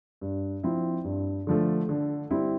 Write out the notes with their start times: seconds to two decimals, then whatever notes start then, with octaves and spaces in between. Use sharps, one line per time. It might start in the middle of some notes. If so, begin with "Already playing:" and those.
0.21 G2
0.63 F3 C4 E4
1.04 G2
1.47 D3 F3 A3
1.89 D3
2.31 G3 C4 E4